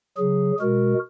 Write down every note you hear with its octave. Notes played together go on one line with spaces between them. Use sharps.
C#3 F#3 G#4
B2 G#3 F#4 A#4